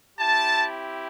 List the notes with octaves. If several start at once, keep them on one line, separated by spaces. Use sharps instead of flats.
C4 E4 G4 A5